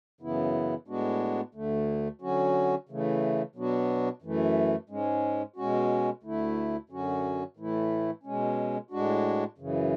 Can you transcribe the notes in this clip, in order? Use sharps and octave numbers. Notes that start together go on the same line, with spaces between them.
F#2 C#3 E3 B3 E4
A2 G#3 B3 D4 F#4
D2 D3 A3
D3 F#3 C#4 F#4
C#3 E3 A3
B2 F#3 B3 D4 F#4
F#2 E3 A3
G#2 G#3 C#4
B2 G#3 C#4 F#4
D2 D3 A3 E4
F#2 D3 F#3 C#4 F#4
A2 E3 A3 E4
B2 G#3 C#4
A2 G#3 D4 F#4
F#2 C#3 E3